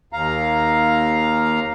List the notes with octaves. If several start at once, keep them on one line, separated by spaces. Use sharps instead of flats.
D#2 F5 A#5